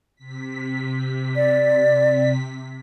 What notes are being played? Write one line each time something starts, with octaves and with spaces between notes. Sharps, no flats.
C3 B6
D5